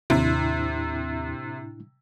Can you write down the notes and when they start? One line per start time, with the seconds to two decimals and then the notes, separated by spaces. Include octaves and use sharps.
0.10 D#2 A2 C3 D4 E4